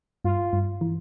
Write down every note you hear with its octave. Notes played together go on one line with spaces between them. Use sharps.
G2 F4
G2
E3